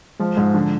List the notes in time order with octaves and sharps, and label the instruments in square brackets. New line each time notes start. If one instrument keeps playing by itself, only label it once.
[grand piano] F3 [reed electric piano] G#3
[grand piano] G#2 [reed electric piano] G#3
[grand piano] D3 [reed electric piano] F3